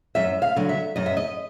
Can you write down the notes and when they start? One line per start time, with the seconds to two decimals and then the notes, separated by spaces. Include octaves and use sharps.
0.15 F#2 E5
0.42 F5
0.56 D3 F#3
0.69 E5
0.96 F#2 D#5
1.06 E5
1.17 D#5